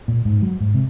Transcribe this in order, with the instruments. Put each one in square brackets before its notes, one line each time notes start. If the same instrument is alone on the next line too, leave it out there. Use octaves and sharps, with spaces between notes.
[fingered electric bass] A#2
G#2
F#3
G#2
C3